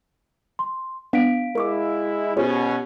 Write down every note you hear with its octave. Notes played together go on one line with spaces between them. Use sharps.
C6
B3 D4 F5 B6 D7
G#3 E4 A#4 C#6 D6
B2 C#4 F4 G4 G#4 C5 C#5